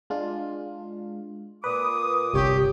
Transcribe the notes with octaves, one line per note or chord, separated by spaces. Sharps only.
G#3 D4 F4
A#2 B4 D6 D#6
G1 C2 G4 C#5